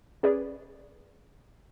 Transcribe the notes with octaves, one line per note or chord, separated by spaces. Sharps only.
C#4 G#4 B4 D5